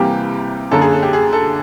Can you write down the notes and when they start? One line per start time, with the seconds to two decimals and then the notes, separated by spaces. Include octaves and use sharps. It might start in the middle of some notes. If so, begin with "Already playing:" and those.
Already playing: C2 C3 E3 G3 A#3 G4
0.71 F#2 D3 F#3 A#3 A4
0.81 G#4
0.93 A4
1.02 G4
1.13 G#4
1.33 A4